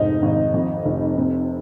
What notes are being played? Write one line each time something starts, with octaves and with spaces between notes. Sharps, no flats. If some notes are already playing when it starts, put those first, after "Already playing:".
Already playing: F1 G#2 D#4
G#1
F2
F1
C3